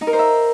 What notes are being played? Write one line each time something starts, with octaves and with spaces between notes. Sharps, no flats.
D#4
A#4
C5
E5